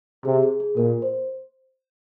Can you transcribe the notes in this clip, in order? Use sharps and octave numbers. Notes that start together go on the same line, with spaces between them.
C3 G#4
G#4
G#4
A#2 A#4
C5